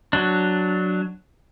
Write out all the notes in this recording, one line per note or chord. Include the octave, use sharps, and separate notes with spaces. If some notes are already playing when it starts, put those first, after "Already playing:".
F#3 D4